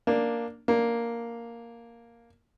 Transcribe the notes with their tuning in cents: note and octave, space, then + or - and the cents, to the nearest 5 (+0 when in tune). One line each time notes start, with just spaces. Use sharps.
A#3 +0 D4 +0
A#3 +0 D4 +0